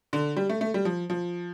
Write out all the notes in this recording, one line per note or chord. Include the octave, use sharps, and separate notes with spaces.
D3
G3
A3
A3
G3
F3
F3